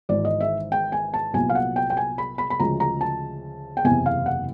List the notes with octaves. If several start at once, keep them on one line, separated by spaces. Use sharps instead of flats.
G#1 G#2 E3 D5
D#5
E5
G5
G#5
A5
C2 A#2 F#3 B3 G#5
F5
F#5
G5
G5
G#5
B5
B5
B5
D2 C#3 F3 G#3 A#5
A#5
A5
G5
F#1 E2 C3 G#5
F5
F#5